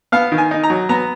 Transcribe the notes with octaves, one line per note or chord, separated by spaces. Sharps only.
B3 F5
D#3
G#5
D#4
A#5
F#3
B3 A#5